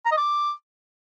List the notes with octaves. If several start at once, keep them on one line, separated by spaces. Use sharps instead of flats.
A#5
D#5
D6